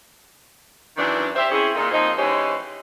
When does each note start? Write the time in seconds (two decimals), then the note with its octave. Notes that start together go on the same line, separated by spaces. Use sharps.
0.98 F#2 D#3 E3 D4
1.36 G4 C5 E5
1.51 C4 C#4 E4 G#4
1.75 A#2 D#4
1.91 F3 A#3 C4 D#4
2.17 E3 G#3 C#4 D#4 G4 C5